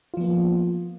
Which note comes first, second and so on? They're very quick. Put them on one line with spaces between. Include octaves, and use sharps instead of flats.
F4 F3 B3 A#3